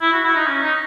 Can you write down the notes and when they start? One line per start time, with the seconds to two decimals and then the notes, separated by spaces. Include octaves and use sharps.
0.01 E4
0.12 F#4
0.23 E4
0.35 D#4
0.47 C#4
0.62 D#4